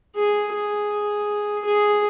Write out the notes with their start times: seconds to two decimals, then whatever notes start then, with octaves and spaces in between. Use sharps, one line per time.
0.16 G#4
0.53 G#4
1.65 G#4